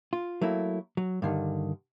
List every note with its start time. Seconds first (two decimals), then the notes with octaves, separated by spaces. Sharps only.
0.13 F4
0.42 F#3 A3 A#3 E4
0.97 F#3
1.22 G2 D3 D#3